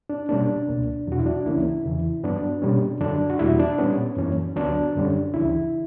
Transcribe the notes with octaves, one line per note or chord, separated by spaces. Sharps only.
D4
B2 G3 A#3 C#4 D4
C#2 B2 A#3
E2 B2 F#3 F#4
E4
D4
C#2 C#3 E3 A#3 C#4 E4
E2 C#3 E3
G2 F#3 B3 D4
B2 G3 A#3 C#4
F#2 D3 F#3 D4
F#4
E2 B2 G3 A#3 E4
D4
A#2 G3 B3 C#4
F#2 E3 A#3 C#4
D2 D3 F#3 B3 D4
F#2 D3 G3 C#4
C#2 C#3 E3 E4